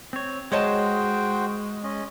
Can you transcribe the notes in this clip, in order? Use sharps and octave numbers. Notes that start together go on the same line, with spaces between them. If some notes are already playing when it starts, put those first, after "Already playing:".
C4 C#5
G#3 F#4 C5 C#5 D#5 G5 A5
C#4 D#5